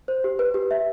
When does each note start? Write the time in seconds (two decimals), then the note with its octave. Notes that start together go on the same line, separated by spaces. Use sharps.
0.08 C5
0.24 G4
0.39 B4
0.54 G4
0.71 E5